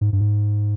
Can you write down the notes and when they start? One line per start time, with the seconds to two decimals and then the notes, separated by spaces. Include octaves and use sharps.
0.01 G#2
0.13 G2
0.21 G#2